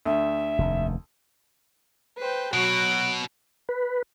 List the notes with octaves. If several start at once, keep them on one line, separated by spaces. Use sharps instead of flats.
D2 E5
F1 D#2
B4 C5 G5
B2 F#3 F#4 F#6 D7
B4